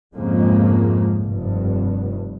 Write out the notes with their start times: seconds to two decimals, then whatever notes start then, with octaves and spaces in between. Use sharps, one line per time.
0.15 F2 G#2 C#3 F3 G#3 A#3
1.21 F1 G2